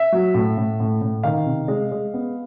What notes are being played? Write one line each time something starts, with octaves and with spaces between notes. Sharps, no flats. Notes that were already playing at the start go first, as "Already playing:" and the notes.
Already playing: E5
F#3
A2
A2
A2
A2
D#3 F5
C3
G#3
G#3
B3